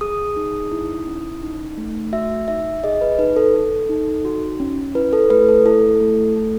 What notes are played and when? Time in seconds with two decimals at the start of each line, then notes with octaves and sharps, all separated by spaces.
0.01 G#4 D#6
0.36 D#4
0.72 E4
1.07 C#4
1.42 D#4
1.77 A3
2.13 F#4 E5
2.48 D#4 E5
2.84 G#4 D#5
3.01 B4
3.19 D#4 B4
3.36 A4
3.54 A4
3.89 D#4
4.25 F#4
4.60 C#4
4.95 E4 B4
5.13 A4
5.30 A3 B4
5.49 A4
5.66 E4 A4
6.01 A3
6.36 A4